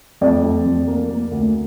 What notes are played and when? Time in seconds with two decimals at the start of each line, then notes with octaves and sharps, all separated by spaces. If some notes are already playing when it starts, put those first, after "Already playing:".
0.21 F2 D5
0.44 F2
0.66 F2
0.88 A#3
1.10 A#3
1.31 D2